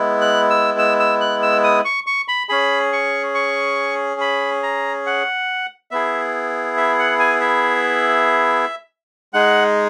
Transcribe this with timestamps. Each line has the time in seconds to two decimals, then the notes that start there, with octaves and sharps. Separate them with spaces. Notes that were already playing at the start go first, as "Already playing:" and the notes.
Already playing: G#3 B3 E4
0.21 F#6
0.50 E6
0.79 E6
1.00 E6
1.21 F#6
1.42 E6
1.64 D#6
1.85 C#6
2.07 C#6
2.28 B5
2.49 C#4 G#4 B5
2.93 C#6
3.35 C#6
4.21 B5
4.63 A#5
5.06 F#5
5.91 B3 E4 G#4 E5
6.77 E5
6.99 F#5
7.19 G#5
7.41 E5
9.33 G#3 D#4 G#4 F#5